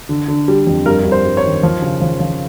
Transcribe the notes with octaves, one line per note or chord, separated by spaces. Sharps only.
D3
D3
G3
F2
G2 A#4
G2
C5
G2
C#5
D#3
F3
C#3
F3
F3